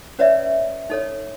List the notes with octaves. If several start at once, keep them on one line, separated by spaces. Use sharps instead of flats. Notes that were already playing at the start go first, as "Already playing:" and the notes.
C#4 B4 C#5 D5 E5
D#4 A4 C#5